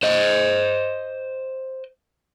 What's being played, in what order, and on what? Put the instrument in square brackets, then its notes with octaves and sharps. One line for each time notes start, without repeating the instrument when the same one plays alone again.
[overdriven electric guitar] C5 D#5